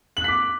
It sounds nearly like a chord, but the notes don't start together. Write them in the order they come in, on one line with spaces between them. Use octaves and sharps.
F#7 F#6 B6 D6